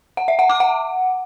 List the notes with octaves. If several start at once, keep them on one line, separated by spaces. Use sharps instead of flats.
F#5
E5
F#5
D6
F#5